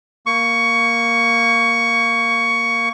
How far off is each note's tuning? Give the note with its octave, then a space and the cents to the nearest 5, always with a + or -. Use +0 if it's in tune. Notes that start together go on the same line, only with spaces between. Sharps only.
A#3 +0 C#6 +15